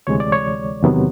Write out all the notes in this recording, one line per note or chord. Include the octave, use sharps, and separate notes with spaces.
D2 C3 E3 G#3 C#5
D5
C#5
E2 C3 D#3 F#3 B3